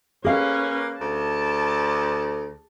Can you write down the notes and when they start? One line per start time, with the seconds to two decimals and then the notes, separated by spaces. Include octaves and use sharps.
0.24 A#3 C#4 G#4 B4 F5
1.01 D2 A5